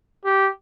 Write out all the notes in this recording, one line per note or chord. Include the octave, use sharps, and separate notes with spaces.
G4